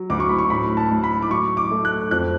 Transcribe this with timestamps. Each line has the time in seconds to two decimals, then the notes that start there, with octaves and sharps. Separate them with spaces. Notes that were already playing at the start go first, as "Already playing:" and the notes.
Already playing: F#3
0.10 D2 D6
0.20 C#6
0.29 B5
0.39 C#6
0.50 A2 B5
0.77 A5
0.91 A2
1.04 B5
1.22 D6
1.30 F#3 C#6
1.57 D6
1.71 A3
1.85 F#6
2.11 F2 F#6